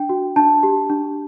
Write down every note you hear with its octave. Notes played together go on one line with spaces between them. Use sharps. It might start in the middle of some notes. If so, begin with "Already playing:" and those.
Already playing: D4 G5
F#4
D4 A5
G4
D4